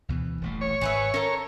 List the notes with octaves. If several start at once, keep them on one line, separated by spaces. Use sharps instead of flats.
D2 B2 E3
D#1 A1 A3
C#5
G#1 G#4 B4 E5
C#4 A4 A#4